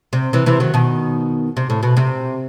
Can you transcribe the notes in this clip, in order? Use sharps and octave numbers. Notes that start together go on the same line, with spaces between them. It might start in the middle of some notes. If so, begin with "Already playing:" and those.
C3
C3 E3
C3 E3
D#3 F#3
B2 D#3
C3
A2
B2
C3